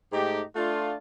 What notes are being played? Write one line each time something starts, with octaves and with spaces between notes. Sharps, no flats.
G#2 A3 D#4 G4
A3 D4 F4